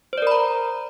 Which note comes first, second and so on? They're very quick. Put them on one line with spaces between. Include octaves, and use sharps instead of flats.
C5 D5 A#4 B5 A#5